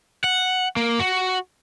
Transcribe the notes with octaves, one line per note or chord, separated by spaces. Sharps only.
F#5
A#3
F#4